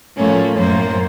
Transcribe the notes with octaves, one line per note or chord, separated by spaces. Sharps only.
A2 F3 A3 A#3 C#4
F#2 A2 A#3 C5